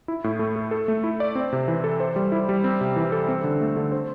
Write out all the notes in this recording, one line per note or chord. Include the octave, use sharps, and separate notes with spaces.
E4
A2
A3
A4
A4
A3
E4
D5
C4
C3
E3
A4
C5
G3
E4
G3
C4
C3
E3
A4
C4
D3
A3
D3
C5